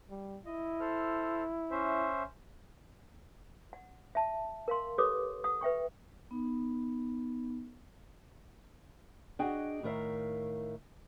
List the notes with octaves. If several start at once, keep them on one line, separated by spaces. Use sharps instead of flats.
G3
E4 D#5
A4 C5 F6
C#4 C5 E5
F#5
E5 A5
A#4 F5 C6
G4 A4 B4 C#5 D6 D#6
F#5 D#6
B4 E5 G5 C#6
B3 D#4
D4 F#4 G#4 D#5 G5
A2 D#3 A#4 E5 F5